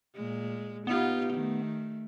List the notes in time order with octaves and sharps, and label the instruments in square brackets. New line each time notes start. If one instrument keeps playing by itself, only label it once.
[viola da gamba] A#2 G#3
[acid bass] B3 [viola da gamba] D#4 F4 G4
[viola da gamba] D#3 A3